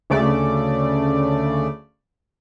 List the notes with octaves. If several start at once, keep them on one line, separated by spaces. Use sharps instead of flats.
D2 C#3 A3 D5